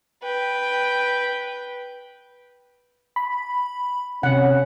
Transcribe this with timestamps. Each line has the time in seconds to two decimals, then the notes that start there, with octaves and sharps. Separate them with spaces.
0.23 B4 G5
3.16 B5
4.23 C3 C#4 F#5